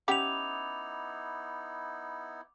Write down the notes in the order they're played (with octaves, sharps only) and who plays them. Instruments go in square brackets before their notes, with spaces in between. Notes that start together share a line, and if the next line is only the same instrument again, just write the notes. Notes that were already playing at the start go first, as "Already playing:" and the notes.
[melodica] B3 D#4 E4 [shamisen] C#4 G4 F#5 [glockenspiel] D6 F7